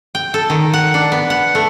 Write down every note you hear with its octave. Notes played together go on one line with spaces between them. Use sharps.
G5
A4
D#3
F#5
D4
B3
F#5
A3